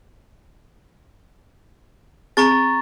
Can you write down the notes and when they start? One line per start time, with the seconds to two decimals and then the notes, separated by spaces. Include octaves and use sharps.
2.37 C4 G#4 A#5 C#6 A6